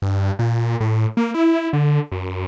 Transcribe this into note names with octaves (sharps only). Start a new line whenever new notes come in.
G2
A#2
A2
A#3
E4
D3
F#2